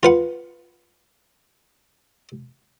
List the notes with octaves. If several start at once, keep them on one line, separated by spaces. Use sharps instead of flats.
F4 B4 F#5